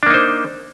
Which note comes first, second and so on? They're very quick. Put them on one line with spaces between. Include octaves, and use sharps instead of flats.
D4 A#3 D#4 C5